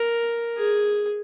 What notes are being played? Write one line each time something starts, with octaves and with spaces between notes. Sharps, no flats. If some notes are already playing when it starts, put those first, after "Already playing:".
Already playing: A#4
G#4